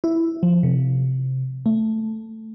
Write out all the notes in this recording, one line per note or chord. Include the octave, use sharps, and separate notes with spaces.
E4
F3
C3
A3